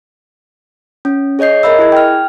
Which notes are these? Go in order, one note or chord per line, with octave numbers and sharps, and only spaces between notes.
C#4
G#4 C#5 D#5 G6 C7
A#4 D#5 E5 B5 E6
E4 G#4 G#6
G5 F6